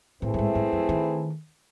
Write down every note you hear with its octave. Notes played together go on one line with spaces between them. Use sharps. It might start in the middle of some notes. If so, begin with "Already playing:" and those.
A2 E3 A3 C4 E4 G#4
F#2
G#2
G#2
F#2
D#3